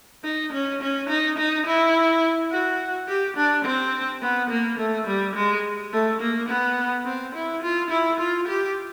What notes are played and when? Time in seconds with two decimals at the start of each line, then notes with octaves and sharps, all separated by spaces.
0.24 D#4
0.53 C#4
0.81 C#4
1.09 D#4
1.38 D#4
1.66 E4
2.51 F#4
3.08 G4
3.37 D4
3.65 C4
4.22 B3
4.50 A#3
4.79 A3
5.07 G3
5.35 G#3
5.93 A3
6.21 A#3
6.49 B3
7.06 C4
7.35 E4
7.62 F4
7.91 E4
8.20 F4
8.48 G4